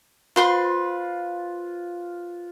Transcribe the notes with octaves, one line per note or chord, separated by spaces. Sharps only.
F4 B4 C5 C6